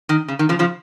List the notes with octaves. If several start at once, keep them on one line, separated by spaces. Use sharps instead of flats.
D#3
C#3
D#3
C#3 F3
C#3 F3